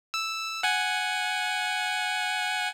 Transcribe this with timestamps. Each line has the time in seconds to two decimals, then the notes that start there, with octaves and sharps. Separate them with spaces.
0.14 E6
0.63 F#5 G#5